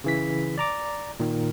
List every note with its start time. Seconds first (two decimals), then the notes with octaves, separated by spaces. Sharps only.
0.04 C#3 E3 B6
0.58 D5 A#5 D6
1.20 A#2 D#3